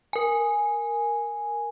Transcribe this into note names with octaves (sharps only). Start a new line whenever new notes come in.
A#4 G#5